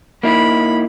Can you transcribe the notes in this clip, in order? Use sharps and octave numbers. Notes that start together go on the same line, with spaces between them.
A#3 D#4 E4 B5